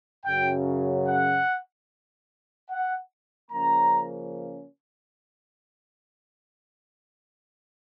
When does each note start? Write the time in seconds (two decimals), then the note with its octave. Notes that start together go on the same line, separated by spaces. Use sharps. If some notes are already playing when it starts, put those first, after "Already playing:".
0.25 F#2 C#3 F#3 G5
1.07 F#5
2.70 F#5
3.51 C#3 F3 A#3 C#4 A#5